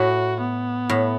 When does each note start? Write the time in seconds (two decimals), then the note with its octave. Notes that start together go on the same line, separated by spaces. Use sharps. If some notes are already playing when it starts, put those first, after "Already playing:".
Already playing: A2 F#4
0.41 B3
0.89 A2